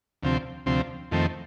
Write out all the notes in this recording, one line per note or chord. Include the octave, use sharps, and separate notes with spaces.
D2 C3 F3 C4
D2 C3 F3 C4
F2 D#3 A3 C4